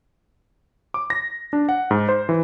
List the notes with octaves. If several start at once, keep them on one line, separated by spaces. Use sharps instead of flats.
D6
A#6
D4
F#5
G#2
C5
E3